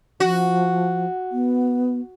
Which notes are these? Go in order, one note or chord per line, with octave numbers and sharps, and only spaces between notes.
F3 F#4
B3